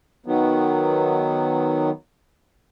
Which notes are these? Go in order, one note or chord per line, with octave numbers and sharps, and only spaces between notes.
D#3 F#3 B3